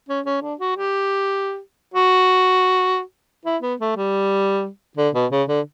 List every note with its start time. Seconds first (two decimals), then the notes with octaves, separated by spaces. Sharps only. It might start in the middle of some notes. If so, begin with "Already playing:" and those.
0.08 C#4
0.26 C#4
0.42 D4
0.59 F#4
0.76 G4
1.94 F#4
3.45 E4
3.62 B3
3.80 A3
3.96 G3
4.97 D3
5.14 B2
5.31 C#3
5.48 D3